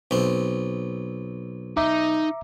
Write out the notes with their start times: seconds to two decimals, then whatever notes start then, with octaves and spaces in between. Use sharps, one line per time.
0.11 B1 C4
1.77 D#4 E5 A#5 D6